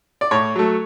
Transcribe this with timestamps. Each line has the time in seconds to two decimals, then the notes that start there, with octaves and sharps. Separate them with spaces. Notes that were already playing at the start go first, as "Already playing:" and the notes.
0.21 D5
0.31 A2 C#5
0.56 F#3 A3